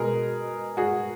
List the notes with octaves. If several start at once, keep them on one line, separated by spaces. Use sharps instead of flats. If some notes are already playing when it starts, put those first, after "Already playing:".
Already playing: B2 G#3 G#4 A#4
F#4 G#4